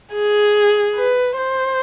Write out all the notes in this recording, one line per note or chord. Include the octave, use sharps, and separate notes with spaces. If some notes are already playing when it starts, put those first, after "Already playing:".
G#4
B4
C5